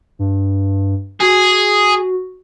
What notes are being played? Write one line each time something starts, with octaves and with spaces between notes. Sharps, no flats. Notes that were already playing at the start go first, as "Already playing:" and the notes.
G2
F#4 G#4